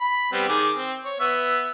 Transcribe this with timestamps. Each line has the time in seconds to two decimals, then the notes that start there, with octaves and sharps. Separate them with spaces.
0.01 B5
0.32 G3 B3 C4
0.48 D#3 G#4 D6
0.75 C4
1.05 C#5
1.20 B3 E5